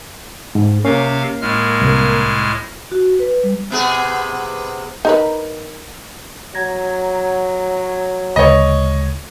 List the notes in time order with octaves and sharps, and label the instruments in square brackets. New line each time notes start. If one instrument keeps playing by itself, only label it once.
[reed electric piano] G#2
[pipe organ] C3 F5 [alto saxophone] A#3 [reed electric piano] C#4
[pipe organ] A2 G#3 F6
[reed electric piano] C2
[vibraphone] F#4
B4
G3
[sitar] C3 B3 G#4
[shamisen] D#4 A#4 B4
[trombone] F#3 [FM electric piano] A#5 G#6 A#6
[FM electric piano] D2 C#3 G#3 [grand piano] C#5 D#5